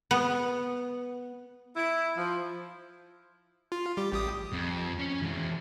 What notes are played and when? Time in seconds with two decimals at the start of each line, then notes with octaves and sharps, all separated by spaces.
0.11 B3
1.76 E4
2.17 F3
3.72 F4
3.97 G3 G4
4.12 A1 G4 D#6
4.53 F2
4.99 C#4 C#5
5.22 E3 G#3